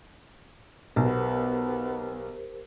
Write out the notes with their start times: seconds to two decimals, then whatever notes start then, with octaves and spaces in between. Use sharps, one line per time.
0.96 B1 B3 G4 A#4 C5